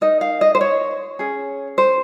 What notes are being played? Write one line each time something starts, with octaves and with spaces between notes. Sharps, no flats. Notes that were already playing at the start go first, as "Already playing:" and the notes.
D#4 A#4 D#5
F5
D#5
C5
C#5
C#4 G#4
C5